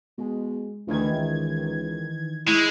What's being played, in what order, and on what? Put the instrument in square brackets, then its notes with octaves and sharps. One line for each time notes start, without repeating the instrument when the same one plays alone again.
[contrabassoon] B2 [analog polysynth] G#3
[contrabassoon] D2 [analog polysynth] D#3 E3 G#6
[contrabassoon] C#2
[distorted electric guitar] G#3 [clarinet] E4 [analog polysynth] C#6